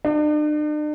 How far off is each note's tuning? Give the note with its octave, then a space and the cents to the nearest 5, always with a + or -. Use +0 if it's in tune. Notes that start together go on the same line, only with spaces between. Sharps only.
D4 +45